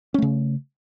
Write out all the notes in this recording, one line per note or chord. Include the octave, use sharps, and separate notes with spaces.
C#3 A3 C#4